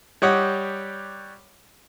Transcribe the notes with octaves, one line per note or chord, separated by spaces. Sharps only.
G3 G4 C#5 D#5 F#5